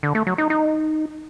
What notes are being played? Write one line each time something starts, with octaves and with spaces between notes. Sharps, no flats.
D3
A3
F#3
D#4
D#4